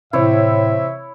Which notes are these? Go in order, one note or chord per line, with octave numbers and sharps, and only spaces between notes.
A2 C3 E3 C4 E4 C#5 E5